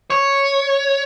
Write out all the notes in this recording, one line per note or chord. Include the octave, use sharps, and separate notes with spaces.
C#5